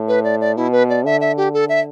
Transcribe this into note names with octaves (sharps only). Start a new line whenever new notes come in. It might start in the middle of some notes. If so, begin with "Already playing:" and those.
Already playing: A2
B4
D5
D5
B2 E4
B4
D5
D3 E5
E5
G4
A4
E5